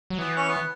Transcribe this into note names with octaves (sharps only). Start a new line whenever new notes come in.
F#3
E3 B3
C#4
B3